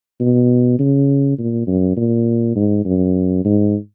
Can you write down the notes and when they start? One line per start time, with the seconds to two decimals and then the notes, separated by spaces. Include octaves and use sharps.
0.20 B2
0.79 C#3
1.39 A#2
1.67 F#2
1.97 A#2
2.56 G#2
2.85 F#2
3.45 G#2